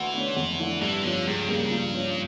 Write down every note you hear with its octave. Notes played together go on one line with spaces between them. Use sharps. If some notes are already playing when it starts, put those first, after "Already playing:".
Already playing: D2 E3
D3 A3 C#4
F2
D3 A3 E4
G2 E3
D3 F3 C#4
C#2 G2
C#3 G3 A#3
F3
C#4 F4